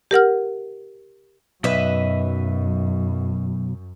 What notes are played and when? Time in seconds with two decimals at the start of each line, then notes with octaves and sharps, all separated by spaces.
0.11 G4 A#4 F#5 F6
1.64 B1 F#2 B4 D#5 E5